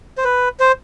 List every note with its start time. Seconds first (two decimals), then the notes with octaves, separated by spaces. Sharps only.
0.18 C5
0.24 B4
0.60 C5